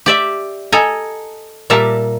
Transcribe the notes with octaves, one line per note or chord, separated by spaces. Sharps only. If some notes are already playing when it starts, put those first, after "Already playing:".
G4 D5 E5
A4 D#5 G#5 A#5
A#2 G3 A#4 E5 A5 A#5